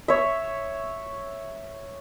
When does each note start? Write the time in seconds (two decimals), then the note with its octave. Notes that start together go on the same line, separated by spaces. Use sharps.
0.08 C#5 E5